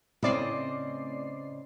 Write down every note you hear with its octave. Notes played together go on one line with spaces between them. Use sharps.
A2 C#3 C4 D5 D#5 C7